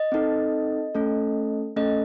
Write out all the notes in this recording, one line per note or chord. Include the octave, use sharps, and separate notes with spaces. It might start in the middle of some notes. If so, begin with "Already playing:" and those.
Already playing: D#5
C4 D#4 A4
A3 C#4 A4
A3 C#4 A4 D#5